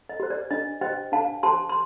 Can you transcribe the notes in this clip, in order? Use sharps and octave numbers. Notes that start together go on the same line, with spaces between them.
D#5
G4 C5
D5
D4 D#5
G4 C5 D#5 G5
D4 F5 A5
G4 C5 A5 C6
C6